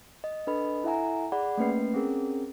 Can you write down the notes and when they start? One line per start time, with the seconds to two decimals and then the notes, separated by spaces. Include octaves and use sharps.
0.24 D#5
0.47 D4 A4 B4 D#5 B5
0.84 E4 A4 E5 F#5 G#5 A#5
1.32 G#4 D5 F#5 B5
1.57 A3 A#3 C#4 B4 C7
1.94 C4 C#4 G#4 A#4